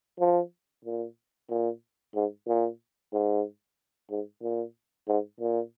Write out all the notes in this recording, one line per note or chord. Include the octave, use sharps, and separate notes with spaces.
F3
A#2
A#2
G#2
A#2
G#2
G#2
A#2
G#2
A#2